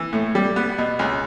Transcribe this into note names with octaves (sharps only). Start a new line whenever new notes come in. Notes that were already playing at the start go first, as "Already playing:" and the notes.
Already playing: E3
A2
G3
B3
B2
C#2